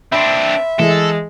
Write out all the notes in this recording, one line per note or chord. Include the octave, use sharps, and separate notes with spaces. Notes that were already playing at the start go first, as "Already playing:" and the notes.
C4 D4 E5 B5 C6
E3 G#3 A4